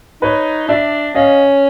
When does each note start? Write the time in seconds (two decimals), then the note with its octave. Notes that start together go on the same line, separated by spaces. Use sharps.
0.22 D#4 B4 C#5
0.68 D4 D5 E5
1.15 C#4 D#5 F5